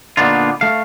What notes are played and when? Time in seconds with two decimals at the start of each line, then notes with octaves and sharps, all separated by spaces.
0.17 A#2 D3 B3 D4 D#4 F4
0.61 A3 F5